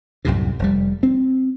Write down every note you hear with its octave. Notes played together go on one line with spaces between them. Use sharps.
C2 F#2 A2 C3
F1 G3
C4